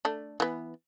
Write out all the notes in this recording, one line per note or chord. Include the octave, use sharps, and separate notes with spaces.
A3 D4
E3 B3